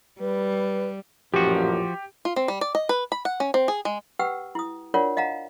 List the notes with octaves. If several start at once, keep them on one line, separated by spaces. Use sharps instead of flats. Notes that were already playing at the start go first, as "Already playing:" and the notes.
G3 B4
A1 F#2 A#2 F3 F#4 G4
F4
C4
G3
D5
D#5
B4
B5
F#5
C#4
C4
G#4
G#3
G4 B4 F#5 G5 E6
E4 D#6
D4 F4 A#4 C#5 D5 F#5
D#5 F5 F#5 A#5